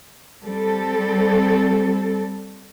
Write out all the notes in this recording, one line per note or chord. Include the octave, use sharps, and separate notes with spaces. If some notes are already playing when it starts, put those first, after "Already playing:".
G3 C4 A4